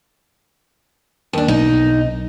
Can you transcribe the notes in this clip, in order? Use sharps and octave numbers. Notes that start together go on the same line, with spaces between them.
D#2 D4
B1 D#4